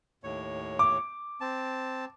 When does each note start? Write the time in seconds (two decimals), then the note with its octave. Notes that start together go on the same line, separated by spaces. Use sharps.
0.24 D#2 A2 C#5
0.79 D6
1.41 C4 A5